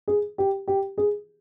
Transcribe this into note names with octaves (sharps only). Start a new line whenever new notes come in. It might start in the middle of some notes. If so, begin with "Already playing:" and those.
G#4
G4
G4
G#4